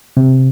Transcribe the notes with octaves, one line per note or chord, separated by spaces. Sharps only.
C3